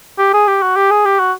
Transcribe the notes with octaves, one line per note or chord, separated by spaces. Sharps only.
G4
G#4
G4
F#4
G4
G#4
G4
F#4